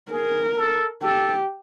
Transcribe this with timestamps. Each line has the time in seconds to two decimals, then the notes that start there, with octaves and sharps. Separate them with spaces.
0.11 G#4 A#4
0.57 A4
1.02 G4 A4